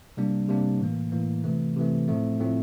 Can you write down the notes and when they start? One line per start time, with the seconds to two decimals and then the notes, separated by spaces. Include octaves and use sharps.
0.17 C3 G3 A#3 D4
0.48 C3 G3 A#3 D4
0.80 A2 E3 A#3
1.12 A2 E3 A#3
1.44 C3 E3 A3
1.76 C3 E3 A3
2.08 A2 F3 A3 C4
2.40 A2 F3 A3 C4